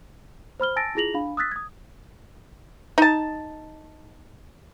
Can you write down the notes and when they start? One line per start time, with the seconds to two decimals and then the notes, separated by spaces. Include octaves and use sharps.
0.60 C5 B5 F6 G7
0.76 G#5 A5 E6 A6 A#6 D7
0.95 E4 F4 G#4 A#6 F7 F#7
1.14 D4 F5 B5
1.37 D#6 E6 F#6 A6 B6
1.51 D#6 G#6
2.98 D#4 A5